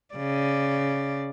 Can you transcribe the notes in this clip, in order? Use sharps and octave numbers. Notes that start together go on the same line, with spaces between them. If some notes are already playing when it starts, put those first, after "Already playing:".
C#3 D5